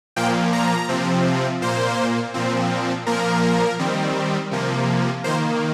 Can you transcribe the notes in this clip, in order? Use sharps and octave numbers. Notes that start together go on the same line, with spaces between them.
A#2 F3 A#3 G5
A#5
C3 F3 C4
A#2 A#3 C5
A#2 F3 C4
A#2 F3 A#3 A#4
D#3 G3 C4
C3 F3 A#3
D#3 A#3 C5